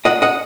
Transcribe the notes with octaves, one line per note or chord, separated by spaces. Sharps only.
D#5 F#5
D#5 F#5